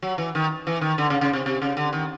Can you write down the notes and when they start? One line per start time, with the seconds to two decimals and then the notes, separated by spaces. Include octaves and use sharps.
0.02 F#3
0.18 E3
0.35 D#3
0.67 E3
0.81 D#3
0.98 D3
1.10 C#3
1.21 C#3
1.33 C3
1.46 C3
1.62 C#3
1.77 D3
1.93 D#3